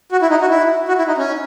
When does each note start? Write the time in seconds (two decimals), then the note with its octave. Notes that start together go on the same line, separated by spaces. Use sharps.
0.12 F#4
0.22 E4
0.30 D#4
0.41 F#4
0.50 E4
0.88 F#4
0.98 E4
1.07 D#4
1.18 C#4